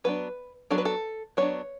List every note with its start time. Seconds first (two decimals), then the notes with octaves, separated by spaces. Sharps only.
0.04 F#3 B3 D4 B4
0.70 F#3 B3 D4 A4
0.78 B4
0.85 A4
1.37 F#3 B3 D4 C#5